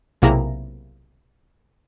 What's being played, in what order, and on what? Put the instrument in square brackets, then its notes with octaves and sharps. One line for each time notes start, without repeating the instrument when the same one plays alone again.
[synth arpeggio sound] B1 C3 A#3 E4 G#4 A#5